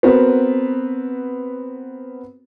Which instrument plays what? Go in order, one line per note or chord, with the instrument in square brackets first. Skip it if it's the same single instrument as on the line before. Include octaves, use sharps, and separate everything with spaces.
[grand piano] B3 C4 F#4 A#4 B4